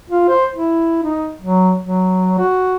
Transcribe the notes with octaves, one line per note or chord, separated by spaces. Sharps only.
F4
C5
E4
D#4
F#3
F#3
F#4